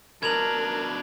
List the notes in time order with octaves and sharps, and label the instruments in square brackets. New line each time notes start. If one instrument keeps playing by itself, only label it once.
[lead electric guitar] B2 D4 [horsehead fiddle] A#4 [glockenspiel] G#6 F7 F#7